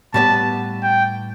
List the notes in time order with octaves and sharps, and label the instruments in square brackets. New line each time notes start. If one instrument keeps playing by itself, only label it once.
[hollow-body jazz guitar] A2 G3 B3 [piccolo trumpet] A5
[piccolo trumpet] G5